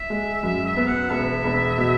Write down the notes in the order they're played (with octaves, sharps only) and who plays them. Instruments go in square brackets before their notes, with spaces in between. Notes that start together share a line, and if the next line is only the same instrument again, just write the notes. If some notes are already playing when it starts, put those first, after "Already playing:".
Already playing: [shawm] E5
[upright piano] G#3
[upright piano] F#2 [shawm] E5
[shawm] E5
[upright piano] B3
[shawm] F#5
[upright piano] E1 [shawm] E5
[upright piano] E1
B2